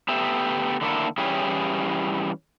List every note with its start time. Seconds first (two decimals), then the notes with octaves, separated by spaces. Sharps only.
0.08 A3 B3 G4 E5
0.81 D3 D#3 A3 A#3 E4 A4
1.18 E3 G3 C#4 E4 G4 G#4